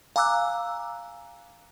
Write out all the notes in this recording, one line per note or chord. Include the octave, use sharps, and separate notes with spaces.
F5 G#5 A#5 D6 E6 F#6